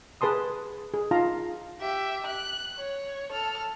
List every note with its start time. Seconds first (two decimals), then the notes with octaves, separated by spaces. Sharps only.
0.21 G#4 B4 A5 C6 D#6
0.94 G#4
1.11 D#4 F4 F5 A5 A#5
1.81 G4 E5
2.27 F#6
2.78 C#5
3.32 A4 F6